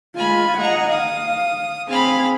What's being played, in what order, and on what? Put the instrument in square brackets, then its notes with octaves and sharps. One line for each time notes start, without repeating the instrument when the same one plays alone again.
[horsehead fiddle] G#3 F4 [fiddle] G#5 B5
[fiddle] G#4 A#5 [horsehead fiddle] D#5 F#5
[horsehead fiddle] F5 [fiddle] D#6
[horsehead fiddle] C4 G#4 [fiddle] F5 B5